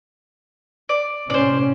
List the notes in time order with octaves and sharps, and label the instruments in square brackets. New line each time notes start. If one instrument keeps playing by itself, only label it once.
[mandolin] D5
[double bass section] A2 C3 C#4 [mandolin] C5 D5